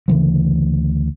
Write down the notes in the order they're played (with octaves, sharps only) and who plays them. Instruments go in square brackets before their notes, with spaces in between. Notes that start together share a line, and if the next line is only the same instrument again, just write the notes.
[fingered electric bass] D2 C#3 E3 F3